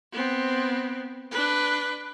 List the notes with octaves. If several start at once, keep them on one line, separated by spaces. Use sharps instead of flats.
B3 C4
D4 B4